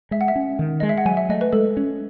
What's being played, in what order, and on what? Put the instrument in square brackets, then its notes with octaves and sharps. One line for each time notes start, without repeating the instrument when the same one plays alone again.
[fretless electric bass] G#3 [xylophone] E5
[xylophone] F#5
E5
[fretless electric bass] C#4
D#3
[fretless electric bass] G#3 [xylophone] D#5
[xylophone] E5
F#5
[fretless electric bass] F#3 [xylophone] G#5
[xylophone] E5
[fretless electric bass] A3 [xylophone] D#5
[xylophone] B4
[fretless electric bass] G#3 [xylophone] A4
[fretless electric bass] C#4